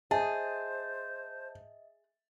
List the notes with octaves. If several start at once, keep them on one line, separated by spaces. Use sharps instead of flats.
G#4 C5 D#5 E5 A5